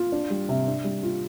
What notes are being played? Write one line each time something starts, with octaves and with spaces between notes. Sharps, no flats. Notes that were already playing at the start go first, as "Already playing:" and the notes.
Already playing: F4
D4
G3
C3
D4
G3
F4